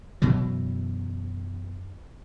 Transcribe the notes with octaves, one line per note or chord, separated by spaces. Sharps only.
F#2 B2 E3 F#3